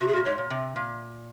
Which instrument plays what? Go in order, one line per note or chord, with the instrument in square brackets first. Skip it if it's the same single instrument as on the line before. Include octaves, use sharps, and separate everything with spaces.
[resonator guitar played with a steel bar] C3 [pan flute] F#4
[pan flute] G#4
[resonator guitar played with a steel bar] A#2 [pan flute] F#4
[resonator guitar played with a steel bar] G#2 [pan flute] C#5
[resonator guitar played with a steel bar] A#2
C3
A#2